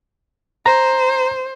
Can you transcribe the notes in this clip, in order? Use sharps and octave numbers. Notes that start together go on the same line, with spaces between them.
C5 A#5